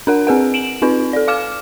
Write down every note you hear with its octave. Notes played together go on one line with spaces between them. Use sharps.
D4 A#4 F#5
C4 G#4 B4 F#5
D7 E7 F#7
C4 D#4 F4 B4
A4 D5
F5 D6 F6 E7